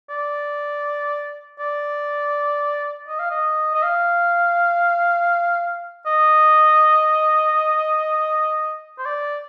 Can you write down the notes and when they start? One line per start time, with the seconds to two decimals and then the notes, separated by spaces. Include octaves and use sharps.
0.10 D5
1.59 D5
3.08 D#5
3.19 F5
3.30 D#5
3.75 D#5
3.83 F5
6.06 D#5
8.98 C5
9.06 D5